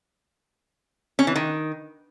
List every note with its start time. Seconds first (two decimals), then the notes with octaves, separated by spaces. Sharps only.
1.19 C#4
1.27 E3
1.36 D#3